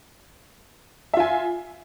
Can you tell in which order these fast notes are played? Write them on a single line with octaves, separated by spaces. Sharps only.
E5 F4 G#5